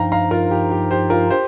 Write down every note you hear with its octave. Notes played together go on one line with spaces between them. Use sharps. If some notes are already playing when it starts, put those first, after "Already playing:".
Already playing: G2 F3 D#4 F5 G5 A#5
F5 A#5
F4 A#4
G4
G4
G4 C5
F4 A#4
G4 C5